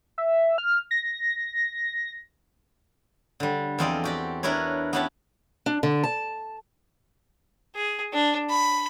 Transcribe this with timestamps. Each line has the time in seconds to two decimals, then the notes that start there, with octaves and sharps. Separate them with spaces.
0.18 E5
0.58 F6
0.91 A#6
3.40 D3 G3
3.79 E2 F3 C4 D5 D#5 G5
4.04 F#4 G4 D5
4.43 D4 E4 A#4 B4 C#5
4.93 B3 C#4 E4 G4 F#5 A5
5.66 D4
5.83 D3
6.04 A5
7.76 G#4
8.13 D4
8.50 B5